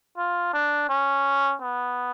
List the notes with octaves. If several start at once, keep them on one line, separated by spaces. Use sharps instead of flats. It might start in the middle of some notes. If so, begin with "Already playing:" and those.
F4
D4
C#4
B3